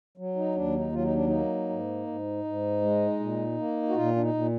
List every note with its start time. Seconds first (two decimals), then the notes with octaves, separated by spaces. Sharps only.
0.17 F#3
0.36 D#4
0.55 D#2 D4
0.75 D#4
0.92 F#3 F4
1.03 D#4
1.14 D4
1.26 A#3 D#4
1.69 G#2
2.07 G#2
2.44 G#2
2.82 G#3
3.20 A#2
3.58 A#3
3.89 F#4
3.95 A#2 F4
4.16 D4
4.20 D#4
4.34 A#2